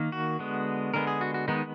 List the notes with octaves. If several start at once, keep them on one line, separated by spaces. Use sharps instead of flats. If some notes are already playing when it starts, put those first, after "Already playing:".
Already playing: D#3 A#3
F#4
D3 G#3 B3
D3 G#3 B3 A#4
G#4
F#4
F#4
D#3 G#3 B3 D#4